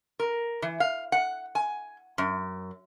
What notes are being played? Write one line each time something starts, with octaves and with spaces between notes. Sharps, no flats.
A#4
E3
F5
F#5
G#5
F#2